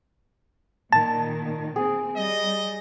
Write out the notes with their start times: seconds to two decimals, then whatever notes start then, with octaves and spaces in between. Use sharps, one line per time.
0.92 A#2 D#3 A5
1.76 C4 G#4
2.17 G3 D#5